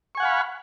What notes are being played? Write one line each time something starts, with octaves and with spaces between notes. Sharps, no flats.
F5 F#5 G#5 B5 C#6